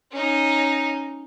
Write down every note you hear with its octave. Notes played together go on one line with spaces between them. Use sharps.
C#4 D#4